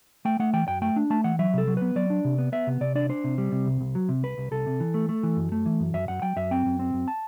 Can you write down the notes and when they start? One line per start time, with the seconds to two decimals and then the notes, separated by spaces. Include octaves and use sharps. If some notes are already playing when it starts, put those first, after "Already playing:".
0.25 A3 G5
0.39 A3 F#5
0.53 E3 G5
0.68 F#2 G5
0.82 A3 G5
0.96 D4
1.10 A3 A5
1.24 E3 F#5
1.39 F#3 E5
1.54 C3 A4
1.67 F#3
1.77 B3 B4
1.96 F#3 D5
2.10 D4
2.25 C3
2.38 B3
2.52 B3 E5
2.67 C3
2.81 C3 D5
2.95 D4 D5
3.09 D4 C5
3.24 C3
3.38 G3
3.52 C3
3.67 C2
3.81 C2
3.95 F#3
4.09 C3
4.23 C2 B4
4.38 C2
4.51 C2 A4
4.66 C3
4.80 E3
4.94 A3
5.09 A3
5.23 E3
5.37 F#2
5.52 A3
5.66 E3
5.80 F#2
5.94 F#2 E5
6.08 F#2 F#5
6.22 F#3 G5
6.36 F#2 E5
6.51 C4 G5
6.66 F#2
6.79 C4
6.94 F#2
7.08 A5